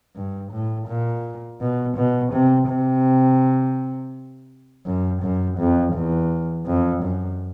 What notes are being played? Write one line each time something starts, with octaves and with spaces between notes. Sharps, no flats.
G2
A2
A#2
B2
B2
C3
C3
F#2
F#2
F2
E2
F2
F#2